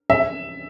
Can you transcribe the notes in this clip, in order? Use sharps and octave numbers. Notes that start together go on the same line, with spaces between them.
E5